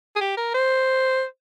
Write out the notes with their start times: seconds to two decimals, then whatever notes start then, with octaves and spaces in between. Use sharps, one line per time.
0.16 G#4
0.21 G4
0.37 A#4
0.54 C5